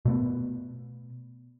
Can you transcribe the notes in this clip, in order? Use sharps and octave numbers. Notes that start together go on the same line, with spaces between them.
B2 A3 B3